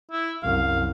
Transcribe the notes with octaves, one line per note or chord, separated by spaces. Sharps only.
E4
C2 F#2 F5